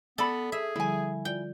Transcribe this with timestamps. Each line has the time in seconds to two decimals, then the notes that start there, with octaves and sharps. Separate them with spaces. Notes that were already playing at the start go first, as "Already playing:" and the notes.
0.18 B3 A4 D5 B5
0.52 G#4 E5
0.76 D3 F3 G3 E4 G#5
1.25 F4 D5 G5